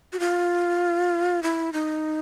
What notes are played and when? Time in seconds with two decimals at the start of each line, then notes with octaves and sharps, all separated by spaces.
0.13 F#4
0.20 F4
1.43 E4
1.73 D#4